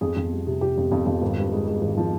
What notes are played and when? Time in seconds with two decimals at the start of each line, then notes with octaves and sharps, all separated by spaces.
0.01 F2 G#4
0.16 F2
0.32 G3
0.47 C3
0.61 C3 G4
0.77 F2
0.92 F2
1.06 F2
1.22 G#1
1.37 G2
1.52 G#3
1.68 G#3
1.82 G#1
1.97 F3